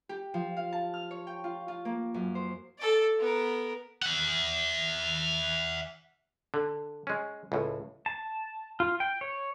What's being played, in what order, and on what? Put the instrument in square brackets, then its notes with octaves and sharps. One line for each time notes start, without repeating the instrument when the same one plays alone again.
[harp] G4
F3
F5
A5
F6
C#5
G5
F4
F4
A#3
F#2
C5
[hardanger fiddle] A4 D5
B3 A#4
[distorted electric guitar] E5 F#5
[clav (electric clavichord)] D3
G#3 C#4
C#2 A2
[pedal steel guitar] A5
F4
G5
C#5